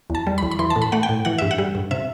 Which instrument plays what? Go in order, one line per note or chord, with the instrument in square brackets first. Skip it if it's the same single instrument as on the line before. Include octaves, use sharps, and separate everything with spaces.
[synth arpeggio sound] E2 A5
G3
B5
E2
B5
E3 C6
A5
A2
B5
A3 F#5
G5
A2
E3 F#5
G2 E5
F#5
G3
G2
C3 E5